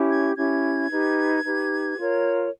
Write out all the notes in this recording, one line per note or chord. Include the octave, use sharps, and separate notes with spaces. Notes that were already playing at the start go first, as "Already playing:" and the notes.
Already playing: C#4 E4 G4
G#6
C#4 E4 G4 G#6
D#4 G4 B4
D#4 G4 B4
F4 A#4 C#5